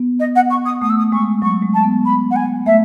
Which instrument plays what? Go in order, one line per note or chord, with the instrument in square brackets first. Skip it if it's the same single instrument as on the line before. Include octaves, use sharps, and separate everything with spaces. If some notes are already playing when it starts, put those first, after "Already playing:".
Already playing: [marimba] B3
[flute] D#5
F#5
C#6
D#6
[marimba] A3 [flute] D#6
[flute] E6
D#6
[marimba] G#3 [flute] C#6
[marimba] F#3 [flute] C#6
[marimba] G#3
[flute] A5
[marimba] B3
[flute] B5
F#5
G#5
[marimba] A3 [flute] E5